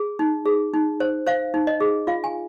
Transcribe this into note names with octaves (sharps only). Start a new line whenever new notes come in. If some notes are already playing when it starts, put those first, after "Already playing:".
Already playing: G#4
D#4
G#4
D#4
C5
C5 F5
D#4
D#5
G#4
F4 F5
G#5